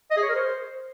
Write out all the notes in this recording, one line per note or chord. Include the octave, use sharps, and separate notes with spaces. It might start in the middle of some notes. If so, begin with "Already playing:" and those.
D#5
G#4
C#5
A#4
C5